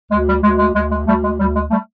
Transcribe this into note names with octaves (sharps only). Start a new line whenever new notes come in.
D2 G#3
G3
D2 G#3
G#3
D2 G#3
G#3
D2 G3 A3
G#3
D2 G3
G#3
G3 A3